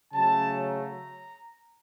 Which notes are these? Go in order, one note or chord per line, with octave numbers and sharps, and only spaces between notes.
C#3 F#3 A3 C#4 A5
A#5